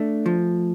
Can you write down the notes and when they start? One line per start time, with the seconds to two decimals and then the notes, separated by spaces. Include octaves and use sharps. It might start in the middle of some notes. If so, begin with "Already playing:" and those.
Already playing: A3 D4
0.26 F3